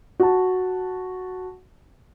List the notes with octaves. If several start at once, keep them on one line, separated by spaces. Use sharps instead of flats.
F#4 A5